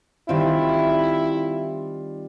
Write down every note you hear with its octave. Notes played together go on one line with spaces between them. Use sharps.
D#3 G3 C4 E4 F4